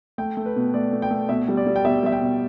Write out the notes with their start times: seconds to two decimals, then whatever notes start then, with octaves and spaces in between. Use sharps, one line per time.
0.18 A3 G5
0.37 A3
0.46 B4
0.56 B2
0.74 A3 D5
0.93 A3
1.02 G5
1.11 A3
1.29 B2 E5
1.48 G3
1.57 D5
1.67 G3
1.76 G5
1.85 B2 E5
2.03 G3 E5
2.12 G5
2.21 B2